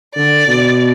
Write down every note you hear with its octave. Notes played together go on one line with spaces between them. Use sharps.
D3 D5
B2